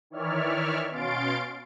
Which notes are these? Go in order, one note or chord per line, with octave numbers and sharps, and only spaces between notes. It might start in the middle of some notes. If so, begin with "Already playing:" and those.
D#3 E3 C#5 D5 E5 F6
B2 C#4 F5 C6 A6 D7